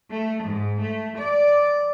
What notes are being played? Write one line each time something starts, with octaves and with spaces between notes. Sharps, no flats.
A3
G#2
A3
D5